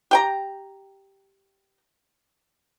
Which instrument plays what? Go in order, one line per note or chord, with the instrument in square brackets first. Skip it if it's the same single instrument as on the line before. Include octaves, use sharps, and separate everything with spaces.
[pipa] G4 G5 A#5